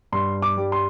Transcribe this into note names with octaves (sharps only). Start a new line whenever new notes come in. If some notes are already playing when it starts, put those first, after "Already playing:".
G2 C6
D6
G3
C6